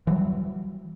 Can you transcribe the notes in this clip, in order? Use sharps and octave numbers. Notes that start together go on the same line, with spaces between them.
E3 F#3 G3